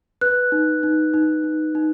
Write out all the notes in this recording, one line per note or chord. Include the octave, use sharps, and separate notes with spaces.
B4 F#6
D#4
D#4
D#4
D#4
D#4